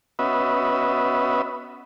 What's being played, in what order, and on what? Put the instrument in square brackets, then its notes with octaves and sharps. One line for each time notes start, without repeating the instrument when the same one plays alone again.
[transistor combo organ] B3 C#4 F#4 B4 D#5 E5